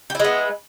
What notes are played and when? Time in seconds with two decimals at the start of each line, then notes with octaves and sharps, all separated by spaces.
0.10 G4
0.15 E4
0.20 G#3
0.24 B3